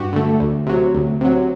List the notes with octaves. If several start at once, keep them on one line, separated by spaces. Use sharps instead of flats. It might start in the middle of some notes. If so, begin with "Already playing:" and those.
Already playing: G2 F#4 G4
D3 A3
D2
C3 F#3
D2
C3 F#3